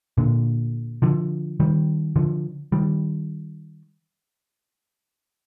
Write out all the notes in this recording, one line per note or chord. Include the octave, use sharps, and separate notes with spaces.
A#2 D3
D3 F3
D#3 G3
D3 F3
D#3 G3